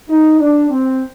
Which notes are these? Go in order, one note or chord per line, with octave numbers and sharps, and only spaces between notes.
D#4
D4
C4